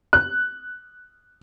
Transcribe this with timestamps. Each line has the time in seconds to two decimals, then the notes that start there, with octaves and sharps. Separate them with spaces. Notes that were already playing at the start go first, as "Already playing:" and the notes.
0.13 F#6